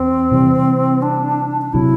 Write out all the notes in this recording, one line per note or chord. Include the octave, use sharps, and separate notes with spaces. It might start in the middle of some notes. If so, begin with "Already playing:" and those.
Already playing: E2 C4
C3 E3 G3
D4
D4
C3 F#3 E4